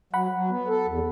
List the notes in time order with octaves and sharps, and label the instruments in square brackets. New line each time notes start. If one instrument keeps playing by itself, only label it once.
[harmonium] F#3 [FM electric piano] F#5 B5
[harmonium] F#3
B3
A4
E2